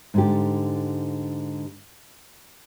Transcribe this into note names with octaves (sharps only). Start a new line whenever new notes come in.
G#2 D3 G4